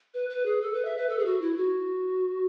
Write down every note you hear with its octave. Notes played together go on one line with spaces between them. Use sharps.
B4
B4
G#4
A4
B4
E5
B4
A4
G#4
F#4
E4
F#4